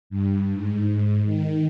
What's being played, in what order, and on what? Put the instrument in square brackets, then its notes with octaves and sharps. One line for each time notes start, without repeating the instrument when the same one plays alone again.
[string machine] G2
G#2
D#3